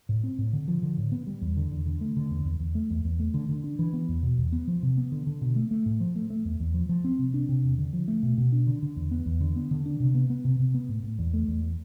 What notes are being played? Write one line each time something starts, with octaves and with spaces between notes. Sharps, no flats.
A2
C4
A2
D3
F3
D3
A2
B3
G3
E2
D3
E2
D3
A3
D3
E2
E2
E2
A3
E2
E2
A3
D3
D3
D4
E3
B3
E2
B2
E2
B3
F3
C3
B3
D3
D3
B2
A3
A3
A2
F3
A3
A3
E2
E2
F3
F3
C4
C3
D4
C3
E2
D3
F3
A3
B2
B2
D4
D3
D3
E2
B3
E2
D3
B3
D3
D4
C3
B3
B3
C3
C3
B3
A2
A2
E2
A3
E2